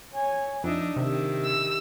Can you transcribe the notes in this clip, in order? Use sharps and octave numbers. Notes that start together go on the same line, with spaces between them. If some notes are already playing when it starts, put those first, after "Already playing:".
C#5 G#5
F2 D4 D#4 E5
C3 D#3 G4 E5
E6